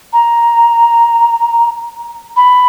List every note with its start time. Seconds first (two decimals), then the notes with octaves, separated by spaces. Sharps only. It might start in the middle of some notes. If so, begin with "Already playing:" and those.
0.13 A#5
2.36 B5